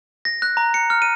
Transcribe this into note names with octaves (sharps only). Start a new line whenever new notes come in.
A#6
F#6
A#5
C#7
F6
D#7